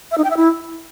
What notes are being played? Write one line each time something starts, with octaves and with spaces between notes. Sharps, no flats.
E5
D#4
G5
E5
E4